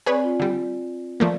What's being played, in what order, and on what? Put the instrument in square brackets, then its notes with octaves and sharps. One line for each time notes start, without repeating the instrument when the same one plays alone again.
[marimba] C4 D5 G#5 [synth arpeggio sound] G#4 B4 C#5
[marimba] F4
[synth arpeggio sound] D3 G3
[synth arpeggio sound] F3 A3 A#3 [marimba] D5